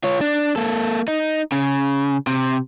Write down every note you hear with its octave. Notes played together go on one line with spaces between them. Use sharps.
F4 C#5
D4
A#3 A4
D#4
C#3
C3